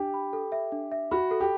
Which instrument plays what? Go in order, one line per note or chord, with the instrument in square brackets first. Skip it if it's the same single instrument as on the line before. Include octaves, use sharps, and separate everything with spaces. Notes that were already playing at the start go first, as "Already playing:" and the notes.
Already playing: [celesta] D4 [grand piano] G4
[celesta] B5
A4
E5
D4
E5
[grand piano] F#4 [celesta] B5
[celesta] A4
[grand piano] G4